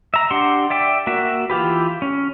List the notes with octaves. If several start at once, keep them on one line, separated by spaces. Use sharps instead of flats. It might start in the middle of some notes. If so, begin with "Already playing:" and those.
E5 A#5
D4 G4 F#5 C6
D5 E5 G5
A#3 F#4 E5
E3 F4 G4 B4
C#4